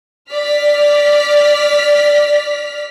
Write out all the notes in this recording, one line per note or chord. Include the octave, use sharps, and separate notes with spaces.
D5 F6 B6